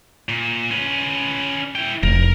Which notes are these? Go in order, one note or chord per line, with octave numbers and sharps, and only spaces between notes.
A#2
C#4 B4
E4 G5
F1 A#4